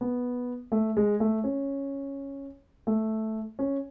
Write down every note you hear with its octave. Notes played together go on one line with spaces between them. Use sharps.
B3
A3
G#3
A3
C#4
A3
C#4